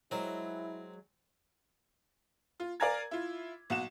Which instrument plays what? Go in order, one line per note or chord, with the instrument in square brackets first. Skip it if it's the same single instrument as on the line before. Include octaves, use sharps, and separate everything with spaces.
[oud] F#3 G#3 [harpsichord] C4 A#4 [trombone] E4
[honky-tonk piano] F4
A#4 D5 F5 G#5 A#5 G#6
E4 F4
B1 F#4 E7